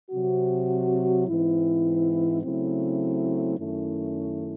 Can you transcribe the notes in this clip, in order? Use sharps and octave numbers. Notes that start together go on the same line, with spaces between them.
C3 F#3 C4 F#4
G#2 E3 C4 E4
C#3 F#3 A3 C4 E4
F#2 D#3 A3 C#4 E4